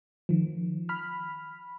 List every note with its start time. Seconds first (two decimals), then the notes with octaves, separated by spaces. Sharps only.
0.29 D#3 F3
0.89 B5 F6